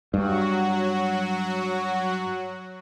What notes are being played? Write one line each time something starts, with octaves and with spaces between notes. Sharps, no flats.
G2 F#3 F#4